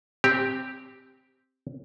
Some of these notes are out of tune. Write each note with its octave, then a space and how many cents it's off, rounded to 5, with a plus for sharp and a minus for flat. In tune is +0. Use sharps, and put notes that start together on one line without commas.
C4 +0 G4 +0